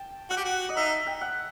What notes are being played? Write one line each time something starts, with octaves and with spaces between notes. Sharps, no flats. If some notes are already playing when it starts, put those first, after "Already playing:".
Already playing: G5 A5
F#4 F#5
G4
F#4
D#5
D#4 E5
G5
F#5